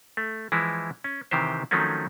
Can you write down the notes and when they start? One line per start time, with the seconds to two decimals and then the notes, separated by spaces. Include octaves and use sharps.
0.17 A3
0.52 E3 F3 G#3 E4
1.04 C#4
1.31 C3 D#3 E3 G4 C5
1.71 D#3 F3 F#3 A3 C4 C#4